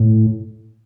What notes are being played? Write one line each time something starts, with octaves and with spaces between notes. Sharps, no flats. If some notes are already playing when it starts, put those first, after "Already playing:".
Already playing: A2